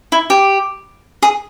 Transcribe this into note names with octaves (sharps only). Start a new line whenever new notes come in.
E4
G4
G#4